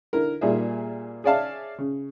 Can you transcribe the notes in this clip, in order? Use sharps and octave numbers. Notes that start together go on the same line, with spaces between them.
D3 E4 A#4
A#2 G3 F4 G#4 E5
G#4 C#5 D5 E5 F5 A5
C#3